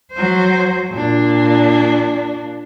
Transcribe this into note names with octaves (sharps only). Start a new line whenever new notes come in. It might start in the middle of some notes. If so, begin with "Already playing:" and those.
F#3 C5
A#2 D4